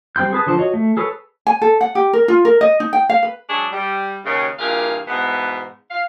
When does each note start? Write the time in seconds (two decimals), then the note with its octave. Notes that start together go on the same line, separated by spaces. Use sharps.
0.16 G3 C4 G5 C6 G6
0.33 G#4 B4 A5 D#6
0.46 D3 F3 C5 A5
0.58 F#4 C#5 D#5
0.74 A3
0.97 G#4 A4 B4 C#5
1.47 G#5
1.62 A4
1.81 F#5
1.95 G4
2.13 A#4
2.28 F4
2.45 A#4
2.61 D#5
2.80 D#4
2.93 G5
3.09 F5
3.23 B4
3.49 F#3 G#3 D4 G#4 C#5 D5
3.72 G3
4.25 D#2 C#3
4.59 G2 A#2 E3 G#4 A#4 F5
5.07 G#2 B2 E3 B3
5.91 F5